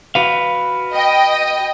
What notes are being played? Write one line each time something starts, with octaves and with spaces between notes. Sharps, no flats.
F#4 B4 F5
D#5 G5